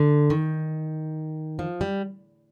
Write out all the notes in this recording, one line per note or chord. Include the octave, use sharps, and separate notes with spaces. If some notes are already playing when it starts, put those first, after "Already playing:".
Already playing: D3
D#3
F3
G3